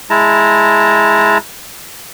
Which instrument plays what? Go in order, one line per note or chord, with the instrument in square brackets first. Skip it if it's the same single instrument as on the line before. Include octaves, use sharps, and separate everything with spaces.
[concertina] G#3 E4 A5 A#5